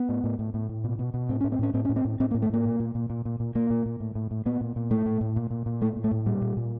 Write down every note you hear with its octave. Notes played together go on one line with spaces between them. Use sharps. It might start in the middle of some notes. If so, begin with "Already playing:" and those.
Already playing: B3
A2
A2
A2
A2
A2
B2
B2
B2
A2 C4
A2 C#4
C4
A2 C#4
A2 C4
A2 C#4
C4
A2
A2 C4
A#3
A2
A3
A2 A#3
A#2
A#2
A#2
A#2
A#2
A#2
A#2 A#3
A#2
A#2
A2
A2
A2
A#2 B3
A#2
A#2
A2 A3
A2
A2
A#2
A#2
A#2
A2 A3
A2
A3
A2
A#2 G3
A#2
A#2